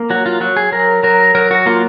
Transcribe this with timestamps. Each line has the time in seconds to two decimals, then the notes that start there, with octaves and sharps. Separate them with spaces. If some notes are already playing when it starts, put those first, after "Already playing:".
Already playing: A#3
0.10 F#3 F#4
0.26 F4
0.41 F#3 F#4
0.57 G#4
0.72 F#3 A#4
1.03 F#3 A#4
1.35 F#3 A#4
1.51 F#4
1.66 A#3 F4